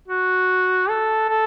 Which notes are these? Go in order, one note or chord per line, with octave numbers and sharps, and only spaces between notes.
F#4
A4
A4